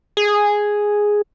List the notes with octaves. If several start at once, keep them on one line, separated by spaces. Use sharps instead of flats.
G#4